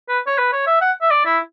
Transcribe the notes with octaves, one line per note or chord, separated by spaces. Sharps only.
B4
C#5
B4
C#5
E5
F#5
E5
D5
E4